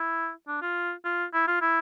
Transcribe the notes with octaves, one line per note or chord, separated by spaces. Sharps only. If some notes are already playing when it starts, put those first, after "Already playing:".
Already playing: E4
D4
F4
F4
E4
F4
E4